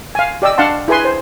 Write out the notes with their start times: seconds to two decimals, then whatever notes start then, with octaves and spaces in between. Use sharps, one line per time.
0.15 F5 G#5
0.42 G4 D5 D#5 E6
0.58 D4 F5 F#5 A5 C6
0.88 E4 G#4 B4 G#5 C6
1.05 C5